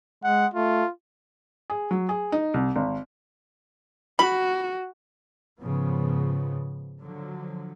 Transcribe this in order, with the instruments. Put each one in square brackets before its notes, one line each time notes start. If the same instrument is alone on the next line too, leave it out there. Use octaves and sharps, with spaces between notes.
[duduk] G#3 [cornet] F#5
[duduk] A3 [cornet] F4
[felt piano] G#4
F#3
G#4
D#4
C2
G#1
[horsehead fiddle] F#4 [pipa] B5
[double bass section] G#2 C#3 F3 B3
D3 F3 F#3